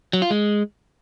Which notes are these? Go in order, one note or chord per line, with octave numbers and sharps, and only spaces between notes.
F#3
F4
G#3